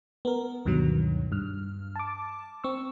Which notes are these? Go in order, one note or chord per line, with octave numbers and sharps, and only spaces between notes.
B3 A#4
D2 G2 B2 D#3 F#3
G2 F6
A5 D6
C4 C#6 E6